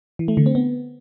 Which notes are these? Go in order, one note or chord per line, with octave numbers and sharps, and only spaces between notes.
E3
A3
D3
C4
B3